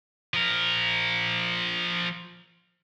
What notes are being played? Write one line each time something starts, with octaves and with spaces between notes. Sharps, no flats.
F3 A#4